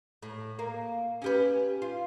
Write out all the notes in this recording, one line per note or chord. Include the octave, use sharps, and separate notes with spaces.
A2
A#3
C#4 G4 B4
F4